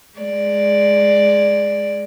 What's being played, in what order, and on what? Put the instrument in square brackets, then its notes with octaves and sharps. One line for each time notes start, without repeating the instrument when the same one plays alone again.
[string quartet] G#3 D5